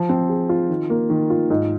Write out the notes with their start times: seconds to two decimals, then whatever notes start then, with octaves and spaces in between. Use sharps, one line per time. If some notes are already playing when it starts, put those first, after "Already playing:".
Already playing: F3
0.09 C4
0.29 G#4
0.49 F4
0.70 D#3
0.90 A#3
1.10 D#3
1.30 F4
1.50 G#2